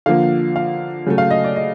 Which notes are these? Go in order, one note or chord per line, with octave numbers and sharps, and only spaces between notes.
D3 F3 A#3 F5
F5
C#3 F#3 A3
F5
D#5
D5
D#5